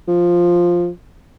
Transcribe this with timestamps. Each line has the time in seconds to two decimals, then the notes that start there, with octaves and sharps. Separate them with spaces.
0.08 F3